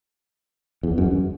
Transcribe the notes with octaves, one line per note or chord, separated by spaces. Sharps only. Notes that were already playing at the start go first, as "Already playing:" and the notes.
E2
F#2